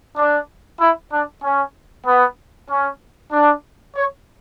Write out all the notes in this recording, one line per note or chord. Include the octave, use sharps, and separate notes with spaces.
D4
E4
D4
C#4
B3
C#4
D4
C#5